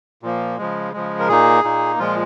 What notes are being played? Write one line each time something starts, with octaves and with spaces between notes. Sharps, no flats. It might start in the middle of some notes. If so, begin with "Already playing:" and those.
A#2 F3 A#3
C#3 F3 G#3
C#3 F3 G#3
A#4
A#2 A#3 D#4 G#4
A#2 A#3 D#4
A#2 F3 G#3 F4